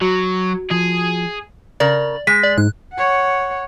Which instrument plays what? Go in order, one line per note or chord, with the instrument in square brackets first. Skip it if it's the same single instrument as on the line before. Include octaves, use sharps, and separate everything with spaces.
[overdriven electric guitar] F#3 [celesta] F#4
[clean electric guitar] F3 [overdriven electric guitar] G#4
[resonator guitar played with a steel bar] C#3 A#4 [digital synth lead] D5
[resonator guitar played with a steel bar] G#3 [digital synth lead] A#6 [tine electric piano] B6
[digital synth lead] D5
[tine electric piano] G#2 [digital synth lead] F#6
[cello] C#5 F#5